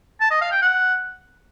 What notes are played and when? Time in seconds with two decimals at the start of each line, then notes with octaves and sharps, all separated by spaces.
0.21 A5
0.31 D#5
0.41 F5
0.52 G5
0.62 F#5